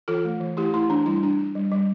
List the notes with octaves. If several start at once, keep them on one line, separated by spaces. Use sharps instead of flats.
E3 F4 A4
A3
E3
A3 E4 G4
A3 E4
E3 D4
G3 E4
D4
D4
G3
G3